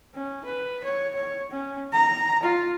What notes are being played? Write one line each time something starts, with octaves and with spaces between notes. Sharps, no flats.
C#4
B4
C#5
C#5
C#4
A#5
F4